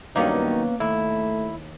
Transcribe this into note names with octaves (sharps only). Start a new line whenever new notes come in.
G2 D#3 F#3 A#3 B3 C#4 D#4
D#2 A3 E4